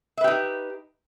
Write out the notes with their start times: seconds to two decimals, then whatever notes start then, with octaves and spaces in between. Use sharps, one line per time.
0.17 E5
0.21 B4
0.24 G4
0.27 D#4